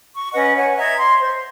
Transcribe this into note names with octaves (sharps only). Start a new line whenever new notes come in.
C#6
C#4 B4 D#5 F#5
C#5 F#5 G#5
D#5 E5 A#5 G#6
C6
C5